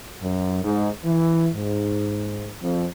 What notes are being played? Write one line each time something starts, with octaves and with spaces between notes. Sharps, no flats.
F#2
G#2
E3
G#2
F2